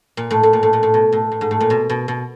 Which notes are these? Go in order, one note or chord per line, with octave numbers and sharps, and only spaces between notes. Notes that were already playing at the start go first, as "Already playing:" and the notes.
A#2
A2
A2
A#2
A2
A#2
A2
B2
A2
A2
G#2
A2
A#2
B2
B2
B2